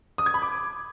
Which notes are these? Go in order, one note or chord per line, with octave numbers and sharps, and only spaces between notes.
D#6
G#6
B5
D6